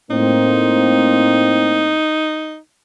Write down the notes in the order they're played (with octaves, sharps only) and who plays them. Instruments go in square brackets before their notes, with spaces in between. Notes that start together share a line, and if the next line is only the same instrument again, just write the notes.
[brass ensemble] A2 A#3 C4 [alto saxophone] D#4